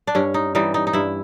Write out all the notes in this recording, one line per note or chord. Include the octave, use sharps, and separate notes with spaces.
D4
G2 C#4
D#4
E3 G3 D#4
D#4
D#4
G2 E4